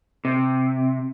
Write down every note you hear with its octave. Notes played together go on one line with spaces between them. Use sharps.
C3